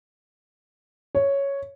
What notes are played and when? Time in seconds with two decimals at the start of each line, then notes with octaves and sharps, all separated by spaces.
1.15 C#5